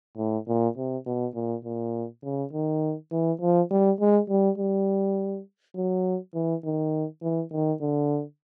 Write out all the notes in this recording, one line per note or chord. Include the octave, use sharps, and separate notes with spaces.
A2
A#2
C3
B2
A#2
A#2
C#3
D#3
E3
F3
G3
G#3
G3
G3
F#3
E3
D#3
E3
D#3
D3